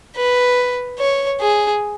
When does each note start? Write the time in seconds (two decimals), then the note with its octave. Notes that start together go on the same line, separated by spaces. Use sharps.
0.16 B4
0.99 C#5
1.40 G#4